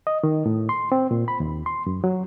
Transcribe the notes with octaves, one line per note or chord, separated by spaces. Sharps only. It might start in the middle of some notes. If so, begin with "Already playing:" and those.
D#5
D#3
A2
C6
C4
A#2
B5
D#2
C6
F#2
F#3